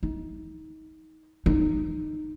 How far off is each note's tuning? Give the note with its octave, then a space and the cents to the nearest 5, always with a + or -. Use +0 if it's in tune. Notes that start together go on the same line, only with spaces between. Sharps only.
D#4 +25
D#4 -20